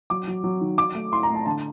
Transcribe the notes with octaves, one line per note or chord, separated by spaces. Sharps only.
F#3 D6
F#3
F#3
D#3
F#3 D6
A3
A2 C6
A#5
A3
A5
D3 A5